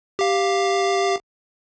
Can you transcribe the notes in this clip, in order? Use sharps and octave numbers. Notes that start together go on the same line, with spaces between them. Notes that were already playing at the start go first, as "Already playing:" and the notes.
G4 F5